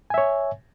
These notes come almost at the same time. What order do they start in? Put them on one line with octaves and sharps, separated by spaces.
G#5 E5 C#5